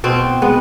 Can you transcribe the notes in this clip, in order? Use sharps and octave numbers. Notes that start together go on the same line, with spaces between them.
B2 C4
G#3 B3